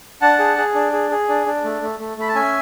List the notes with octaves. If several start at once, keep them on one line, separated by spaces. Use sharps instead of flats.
D4 F#5 A5
G#4
G#4
D4
G#4
G#4
D4
D4
A3
A3
A3
A3 B5
A5
C#4 E5 G#5